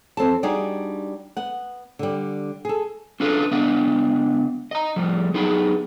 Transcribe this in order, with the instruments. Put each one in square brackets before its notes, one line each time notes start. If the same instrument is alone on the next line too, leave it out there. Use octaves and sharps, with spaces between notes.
[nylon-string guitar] F2 C4 A4 A5
G3 D4 D#4 F#4 G#4
B3 F#5
D3 G3
G#4 A4
[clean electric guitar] C#4 D4 F4 A4 B4
C#2 B3 D4 D#5 F5
D#5 A#5
A2 F3 G3
F#3 B3 D#4 G4 G#4 B5